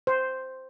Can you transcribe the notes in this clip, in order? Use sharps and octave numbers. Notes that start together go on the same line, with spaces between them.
C5